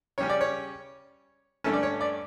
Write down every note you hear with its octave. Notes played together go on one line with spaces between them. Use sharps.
C#3 G3 C#4 C#5
D5
C#5
G2 D3 A3 C#4 A4
D5
C#5
D5